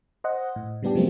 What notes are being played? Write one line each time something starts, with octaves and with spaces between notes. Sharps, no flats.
C5 D#5 F#5
A2
C#3 G3 B3 D4 G4
C3 F3 F#3 G#3 A#3 C4